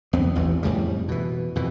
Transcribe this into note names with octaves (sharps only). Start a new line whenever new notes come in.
E2 B3 C4
A1 E2 E3 A3
F2 A2 C#3 G3
B2 E3
F2 B2 E3